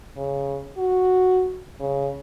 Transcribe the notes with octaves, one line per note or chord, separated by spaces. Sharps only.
C#3
F#4
C#3